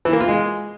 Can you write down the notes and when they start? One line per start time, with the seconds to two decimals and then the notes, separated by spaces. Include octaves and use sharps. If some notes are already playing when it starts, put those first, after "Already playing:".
0.05 E3
0.13 A#3
0.20 F4
0.28 G#3